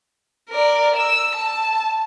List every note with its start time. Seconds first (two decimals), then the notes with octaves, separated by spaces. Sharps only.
0.50 A#4 D5
0.96 E6
1.35 A5